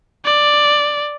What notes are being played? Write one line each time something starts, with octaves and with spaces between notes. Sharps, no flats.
D5